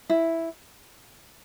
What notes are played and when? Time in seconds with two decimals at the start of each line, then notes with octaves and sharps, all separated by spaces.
0.10 E4